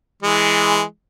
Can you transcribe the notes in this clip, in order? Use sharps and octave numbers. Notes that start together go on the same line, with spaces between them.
E3 G#3